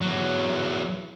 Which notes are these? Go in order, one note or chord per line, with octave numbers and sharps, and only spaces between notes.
E2 F#3